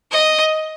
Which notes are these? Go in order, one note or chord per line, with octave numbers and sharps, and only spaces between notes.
D#5